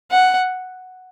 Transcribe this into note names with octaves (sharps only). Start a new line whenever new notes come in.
F#5